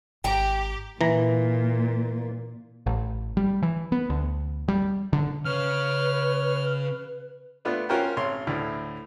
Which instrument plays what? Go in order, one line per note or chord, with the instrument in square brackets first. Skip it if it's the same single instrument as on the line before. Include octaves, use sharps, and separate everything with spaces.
[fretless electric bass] G#1 [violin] G4 [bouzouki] G5 A#5
[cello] A#2 [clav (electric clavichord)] E3 A#5
[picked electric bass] A1
G3
E3
B3
D2
G3
D3
[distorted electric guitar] C#3 [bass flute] B4 [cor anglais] C#5 [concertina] F6
[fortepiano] A3 B3 D4 F4
C#4 F4 F#4 A#4 C5 G5
G#1 C#5 C6
D2 A2 D3